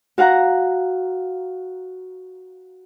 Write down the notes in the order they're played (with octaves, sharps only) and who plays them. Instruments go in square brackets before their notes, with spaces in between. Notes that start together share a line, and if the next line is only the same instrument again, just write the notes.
[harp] F#4 F5 F#5 A#5